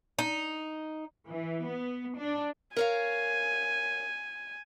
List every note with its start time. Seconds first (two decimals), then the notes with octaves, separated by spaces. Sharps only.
0.19 D#4
1.28 E3
1.67 B3
2.18 D4
2.77 A#4 C#5 F5 G#5